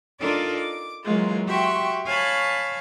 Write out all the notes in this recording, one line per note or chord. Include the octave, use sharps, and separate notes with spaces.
D4 D#4 F4 A4 A#4 D5
D6
E3 F#3 G#3 A#3 F4
F#4 G4 E5 G5 C6 C#6
C#5 F5 G#5 A5 B5 C#6